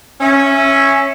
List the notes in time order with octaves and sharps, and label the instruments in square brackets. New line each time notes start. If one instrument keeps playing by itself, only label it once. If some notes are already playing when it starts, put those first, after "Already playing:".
[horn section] C#4 E5